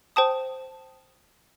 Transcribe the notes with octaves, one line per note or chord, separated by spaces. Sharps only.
C5 G5 A5 D#6